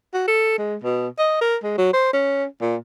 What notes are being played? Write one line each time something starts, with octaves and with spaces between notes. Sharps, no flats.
F#4
A4
G#3
B2
D#5
A#4
G#3
F#3
C5
C#4
A#2